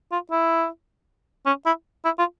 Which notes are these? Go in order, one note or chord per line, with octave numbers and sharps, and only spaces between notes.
F4
E4
C#4
E4
E4
F4